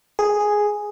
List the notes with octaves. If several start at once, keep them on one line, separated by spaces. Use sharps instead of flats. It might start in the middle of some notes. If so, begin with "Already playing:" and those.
G#4